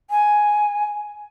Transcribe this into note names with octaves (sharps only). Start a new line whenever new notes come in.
G#5